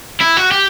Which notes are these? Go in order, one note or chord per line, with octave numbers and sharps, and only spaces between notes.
E4
F#4
G4